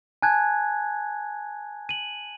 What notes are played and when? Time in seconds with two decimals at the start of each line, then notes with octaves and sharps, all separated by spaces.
0.22 G#5 A5 F#6 G#6
1.89 D#7 F#7